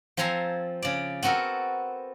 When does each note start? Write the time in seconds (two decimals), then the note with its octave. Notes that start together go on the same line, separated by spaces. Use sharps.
0.17 F3 C4 A4 G#5 A#5 C6
0.82 C#3 D5
1.23 B3 C4 F#4 A4 A#4